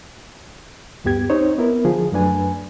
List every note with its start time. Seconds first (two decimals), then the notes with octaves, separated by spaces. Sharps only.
1.04 D2 G2 B3 G4 G#6
1.30 C4 D#4 C5 C#5
1.58 B3 E4 A#4
1.85 D3 F3 G#4
2.12 F#2 F#3 A3 D4 B4 G#5